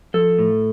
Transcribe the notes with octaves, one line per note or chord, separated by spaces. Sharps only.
F3 A4
A2